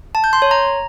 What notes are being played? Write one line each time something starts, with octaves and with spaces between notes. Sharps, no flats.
A5
G6
C6
C#5
A#5